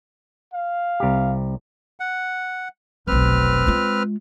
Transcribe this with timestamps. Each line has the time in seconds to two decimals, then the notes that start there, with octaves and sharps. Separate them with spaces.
0.54 F5
1.00 C2 G4
2.00 F#5
3.07 F1 B1 C4 B4 F6
3.67 G#3 F4